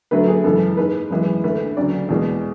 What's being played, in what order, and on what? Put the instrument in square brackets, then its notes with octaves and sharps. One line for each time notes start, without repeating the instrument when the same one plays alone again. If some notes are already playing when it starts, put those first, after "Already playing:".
[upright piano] D2 D3 F#3 A3 B4
G#4
F#2 C#3 E3 G#3 A4
G#2 G#3 B4
F#2 E3 G#3
D2 D3 A3 B4
D2 C#3 F#3 D5
E2 B2 G#3